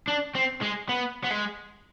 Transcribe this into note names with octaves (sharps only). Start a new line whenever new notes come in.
D4
C4
G#3
B3
B3
G#3